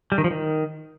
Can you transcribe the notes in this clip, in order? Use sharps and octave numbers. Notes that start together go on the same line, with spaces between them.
G3
D#3
F3
D#3